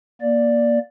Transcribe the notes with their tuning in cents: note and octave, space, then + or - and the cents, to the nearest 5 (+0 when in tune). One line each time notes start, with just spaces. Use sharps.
A#3 +20 D5 +0